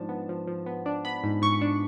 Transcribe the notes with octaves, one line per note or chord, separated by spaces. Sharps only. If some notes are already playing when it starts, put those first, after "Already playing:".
Already playing: G#2 F3 D4 A5
B3
F3
F3
B3
D4
B3 B5
G#2
G#2 C#6
D4